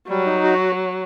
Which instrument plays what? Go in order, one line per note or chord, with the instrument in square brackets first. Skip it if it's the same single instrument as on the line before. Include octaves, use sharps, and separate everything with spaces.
[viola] F#3 [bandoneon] G3
[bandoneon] D#4
F#4